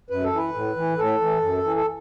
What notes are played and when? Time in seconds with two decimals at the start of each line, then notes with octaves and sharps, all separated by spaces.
0.10 F#2 B4
0.24 A4
0.32 E3
0.37 B4
0.54 A2
0.76 E3
0.98 A2 A4
1.21 E3
1.42 F#2
1.64 E3
1.76 A4